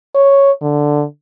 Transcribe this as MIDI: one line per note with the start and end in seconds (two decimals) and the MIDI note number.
0.15 0.52 73
0.62 1.05 50